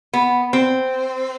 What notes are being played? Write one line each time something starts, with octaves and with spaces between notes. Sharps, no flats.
B3
C4